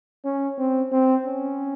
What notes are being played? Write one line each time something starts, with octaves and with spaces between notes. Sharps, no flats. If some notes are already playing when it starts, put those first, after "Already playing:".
C#4
C4
C4
C#4